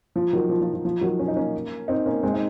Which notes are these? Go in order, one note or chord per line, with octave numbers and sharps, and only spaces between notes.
F3
D#3 F#3
F3
F3
F3
F3
D#3 F#3
C#4
D#4
A#3 C#4
C4 D#4
A#3 C#4
G#3 C4
D#4